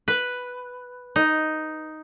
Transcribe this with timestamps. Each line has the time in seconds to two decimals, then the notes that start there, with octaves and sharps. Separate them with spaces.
0.08 B4
1.16 D#4